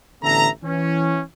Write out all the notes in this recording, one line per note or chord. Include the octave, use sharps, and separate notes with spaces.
A1 D3 B3 A4 E5 A#5
E3 C#4